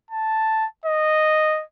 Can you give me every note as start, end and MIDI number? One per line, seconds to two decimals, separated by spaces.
0.10 0.66 81
0.85 1.64 75